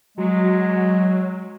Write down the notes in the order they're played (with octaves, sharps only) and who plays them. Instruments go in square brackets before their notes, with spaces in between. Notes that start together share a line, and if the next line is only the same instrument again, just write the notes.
[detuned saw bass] F#3 [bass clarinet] G#3